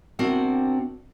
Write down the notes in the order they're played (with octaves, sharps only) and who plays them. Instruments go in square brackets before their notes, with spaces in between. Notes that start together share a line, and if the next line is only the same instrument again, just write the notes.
[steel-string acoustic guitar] C3 C4 D4 F#4 A#4 F#5